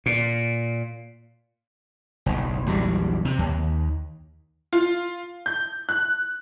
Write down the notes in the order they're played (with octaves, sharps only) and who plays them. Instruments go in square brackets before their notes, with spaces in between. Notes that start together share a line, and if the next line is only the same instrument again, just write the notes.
[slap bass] A#2
F#1 B1
A#1 E2 F#3 G3
C3
D#2
[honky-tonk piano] F4
G6
F#6